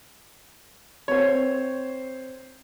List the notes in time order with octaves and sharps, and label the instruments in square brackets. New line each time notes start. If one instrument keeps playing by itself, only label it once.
[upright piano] C4 C5 [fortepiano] C#5